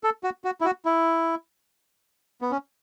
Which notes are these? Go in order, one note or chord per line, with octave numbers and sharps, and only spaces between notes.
A4
F#4
F#4
E4
F#4
E4
B3
C#4